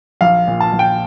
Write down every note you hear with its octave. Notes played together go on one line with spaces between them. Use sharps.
A#1 F5
A#2
A5
A#1
G5